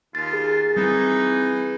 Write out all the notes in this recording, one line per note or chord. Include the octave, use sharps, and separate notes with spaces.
D#2 F4 A6
G#4
E3 G3 C4 D#4